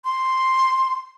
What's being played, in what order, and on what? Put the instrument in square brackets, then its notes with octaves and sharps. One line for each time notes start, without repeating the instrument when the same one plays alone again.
[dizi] C6